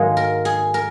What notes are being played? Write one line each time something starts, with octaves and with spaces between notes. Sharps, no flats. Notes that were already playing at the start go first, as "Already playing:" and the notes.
Already playing: G#2 D#3 F#3 A#3 G#4
A#4
G#4
A#4